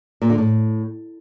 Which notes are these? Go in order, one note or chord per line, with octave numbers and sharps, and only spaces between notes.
A#2
D3
A2